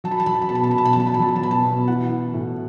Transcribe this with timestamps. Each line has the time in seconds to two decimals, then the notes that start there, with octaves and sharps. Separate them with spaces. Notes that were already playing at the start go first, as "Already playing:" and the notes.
0.04 F#3 A5
0.11 B5
0.20 A5
0.26 F#3 B5
0.33 A5
0.42 B5
0.49 B2 A5
0.55 B5
0.64 A5
0.71 B5
0.74 B2 A5
0.85 B5
0.93 A5
0.96 F#3 B5
1.07 A5
1.14 B5
1.19 F#3 A5
1.28 B5
1.36 A5
1.43 B2 B5
1.51 A5
1.65 B2
1.88 E3 F#5
2.11 E3
2.34 A2